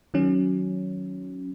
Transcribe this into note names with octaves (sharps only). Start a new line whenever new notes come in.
D#3 F#3 C#4